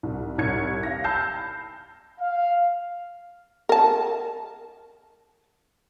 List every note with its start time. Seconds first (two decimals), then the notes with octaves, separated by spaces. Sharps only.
0.03 C2
0.38 C2 C#5 G#6 C#7
0.83 F5 A#6
1.04 A5 B5 E6 F6 G6 C7
2.20 F5
3.69 A#4 A5